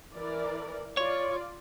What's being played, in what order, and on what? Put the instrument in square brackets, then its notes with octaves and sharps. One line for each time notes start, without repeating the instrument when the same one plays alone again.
[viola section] E3 A#4 D5
[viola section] F4 D5 [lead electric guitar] C#5